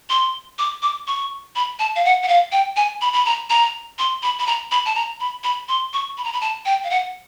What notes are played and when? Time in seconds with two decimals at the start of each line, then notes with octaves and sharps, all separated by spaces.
0.10 C6
0.59 D6
0.82 D6
1.07 C#6
1.56 B5
1.79 A5
1.96 F5
2.05 F#5
2.23 F#5
2.28 F5
2.52 G5
2.76 G#5
3.01 B5
3.13 B5
3.26 A#5
3.50 A#5
3.99 C6
4.23 B5
4.39 B5
4.47 A#5
4.71 B5
4.86 A5
4.95 A#5
5.20 B5
5.44 B5
5.69 C6
5.93 C#6
6.18 B5
6.24 A#5
6.33 B5
6.41 A5
6.66 G5
6.84 F5
6.90 F#5